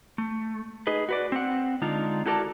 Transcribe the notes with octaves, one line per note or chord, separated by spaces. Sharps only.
A3
D#4 G#4 B4 D#5
F#4 B4 D5
C4 F#5
D3 G#3 D4 D#4 F4
E4 F#4 A4 A#4 D5 A5